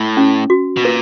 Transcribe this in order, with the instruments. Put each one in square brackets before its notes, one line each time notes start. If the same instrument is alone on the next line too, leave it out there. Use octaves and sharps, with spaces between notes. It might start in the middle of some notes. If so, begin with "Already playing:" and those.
Already playing: [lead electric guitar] A2
[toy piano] C#4
F#4
[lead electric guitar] B2
[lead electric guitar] A#2 [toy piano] B4